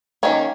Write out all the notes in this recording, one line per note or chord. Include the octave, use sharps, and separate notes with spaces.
D#3 A#3 C#4